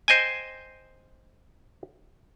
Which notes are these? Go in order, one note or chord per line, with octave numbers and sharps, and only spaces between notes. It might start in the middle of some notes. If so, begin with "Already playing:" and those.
C5 D#5 G5 G#5